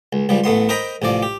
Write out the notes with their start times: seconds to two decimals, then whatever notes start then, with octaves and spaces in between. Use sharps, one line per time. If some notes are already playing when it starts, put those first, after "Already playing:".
0.13 C#2
0.29 C#2 F3 G3
0.44 A1 A3 B3 C6
0.69 A#4 C5 D#5 G5 A#5 B5
1.02 A1 C3 F3 D5
1.23 G4